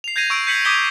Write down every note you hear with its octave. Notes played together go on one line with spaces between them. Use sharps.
C7 F7
G6 G#6 A#6 C7 D#7 F7
C#6 E6 D7
G6 B6 C#7 F#7
D6 D#6 G6 G#6 B6 G7